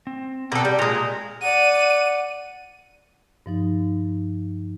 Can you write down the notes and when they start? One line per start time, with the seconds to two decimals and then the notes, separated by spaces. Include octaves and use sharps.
0.07 C4
0.52 B2 A4 A#4 D5 G5
0.65 G3
0.79 A#2 G#3 G4 A#5
1.42 D5 F#5 D#7
3.46 G2 F3 D#4